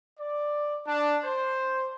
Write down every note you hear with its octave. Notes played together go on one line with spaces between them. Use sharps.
D5
D4
C5